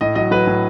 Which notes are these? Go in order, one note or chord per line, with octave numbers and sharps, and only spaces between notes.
A2 D#5
F#3 D#5
F#3 B4
A2